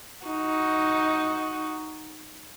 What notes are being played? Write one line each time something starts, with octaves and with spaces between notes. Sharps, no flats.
D#4 F#4